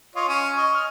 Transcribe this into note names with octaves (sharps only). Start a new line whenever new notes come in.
F4 C#5 D#5
C#4
D#5 C#6
F6